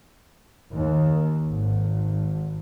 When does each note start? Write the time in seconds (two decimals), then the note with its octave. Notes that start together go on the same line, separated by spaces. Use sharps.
0.73 D#2
1.43 G#1